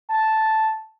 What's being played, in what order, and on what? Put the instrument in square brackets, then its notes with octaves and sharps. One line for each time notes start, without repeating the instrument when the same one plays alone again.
[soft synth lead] A5